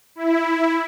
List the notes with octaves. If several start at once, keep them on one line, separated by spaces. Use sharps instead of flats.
E4